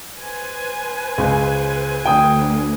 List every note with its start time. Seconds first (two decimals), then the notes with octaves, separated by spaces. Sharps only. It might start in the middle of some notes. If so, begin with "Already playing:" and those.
0.16 B4 C5 G#5
1.18 C#2
2.05 D2 G5 D#6